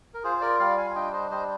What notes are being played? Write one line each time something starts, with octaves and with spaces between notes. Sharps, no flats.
A#4
F4 G#4 C5
C5
A#4 D5
G3 D5 F5
F5 G#5
G#5
D4 D#5 G5
C5 D#5
G3 C5 D#5